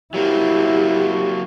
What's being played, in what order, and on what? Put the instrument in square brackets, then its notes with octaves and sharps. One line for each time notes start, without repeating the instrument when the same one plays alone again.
[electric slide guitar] F#3 A#3 C4 [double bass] E4 [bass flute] G4